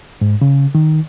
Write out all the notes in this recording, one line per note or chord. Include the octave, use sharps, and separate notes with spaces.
G#2
C#3
D#3